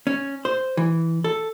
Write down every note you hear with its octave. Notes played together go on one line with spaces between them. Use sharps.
C#4
C5
E3
A4